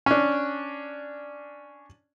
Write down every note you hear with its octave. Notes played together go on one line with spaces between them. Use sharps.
C#4 D4